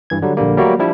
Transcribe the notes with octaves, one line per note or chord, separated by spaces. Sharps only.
G2 E3 G#6
D3 F#3 G3
A#1 D3 G3 A#3
F#3 G3 A3 A#3 F#4
F3 G3 D4 E4